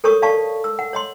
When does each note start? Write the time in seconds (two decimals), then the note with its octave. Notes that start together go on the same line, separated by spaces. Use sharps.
0.04 A4 A#4 C#5 C#6 D#6
0.22 D5 F5 A5 C#6
0.64 E6
0.79 F#5
0.93 C#5 D#5 C6